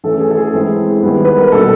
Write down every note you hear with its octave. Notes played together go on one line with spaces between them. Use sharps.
E3 A3 C#4 A4
G#4
A4
G#4
E3 G#3 C4 E4
D#3 G3 B3
B4
A#4
B2 G3 A#3 D4 A4